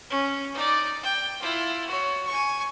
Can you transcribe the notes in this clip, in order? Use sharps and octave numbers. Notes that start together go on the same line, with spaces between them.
C#4
D#4 D5
G5
E4 F4
F#4 C#5
G#5 C#6